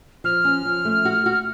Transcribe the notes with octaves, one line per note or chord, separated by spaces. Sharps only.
F3 F6
C#4
F3
A3
F#4
F#4